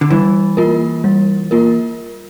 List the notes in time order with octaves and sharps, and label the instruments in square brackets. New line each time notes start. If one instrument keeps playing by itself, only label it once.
[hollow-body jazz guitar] D3
[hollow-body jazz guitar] E3 [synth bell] G3
[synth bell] A#3 F4 A#4
G3
A#3 F4 A#4